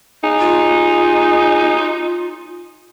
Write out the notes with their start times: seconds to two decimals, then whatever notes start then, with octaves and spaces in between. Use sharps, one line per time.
0.24 D#4 G#4
0.39 F4